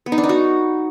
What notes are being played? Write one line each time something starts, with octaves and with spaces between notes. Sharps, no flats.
B3
D#4
D4
D#4
F#4